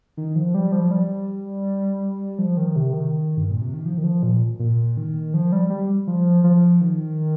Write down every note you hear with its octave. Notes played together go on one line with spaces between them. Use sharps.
D#3
F3
G3
F3
G3
F3
D#3
C3
D#3
G2
A#2
C3
D#3
F3
D#3
F3
A#2
A#2
D#3
F3
G3
G3
F3
F3
D#3